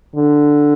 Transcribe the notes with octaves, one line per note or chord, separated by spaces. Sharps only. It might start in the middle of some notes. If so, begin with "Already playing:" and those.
D3